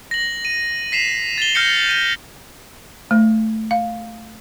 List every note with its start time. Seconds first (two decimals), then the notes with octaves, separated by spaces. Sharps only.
0.11 A#6 F#7
0.45 D#7
0.92 B6 C7 E7 F7
1.38 A6 F7 G7
1.55 F6 G6 A#6 C#7
1.89 D#7 G7
3.11 A3
3.71 F5